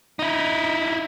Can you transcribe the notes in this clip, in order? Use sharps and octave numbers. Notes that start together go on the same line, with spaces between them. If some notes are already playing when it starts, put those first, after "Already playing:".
D#4 E4